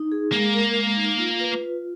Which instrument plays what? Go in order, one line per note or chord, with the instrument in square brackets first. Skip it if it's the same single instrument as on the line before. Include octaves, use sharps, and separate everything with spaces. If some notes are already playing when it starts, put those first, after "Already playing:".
Already playing: [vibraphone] D#4
G#4
[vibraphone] G#3 [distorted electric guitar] A#3
[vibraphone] A#4
G#3
D#4
F4
B4
F4